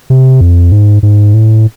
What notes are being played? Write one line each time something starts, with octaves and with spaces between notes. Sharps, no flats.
C3
F2
G#2
G#2
A2